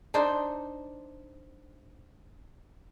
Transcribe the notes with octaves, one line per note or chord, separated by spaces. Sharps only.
D4 D#4 C5